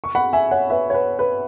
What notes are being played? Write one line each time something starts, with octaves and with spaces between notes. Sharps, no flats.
C#6
F#5 B5
E5 G#5
C#5 F#5
B4 E5
C#5
B4
B4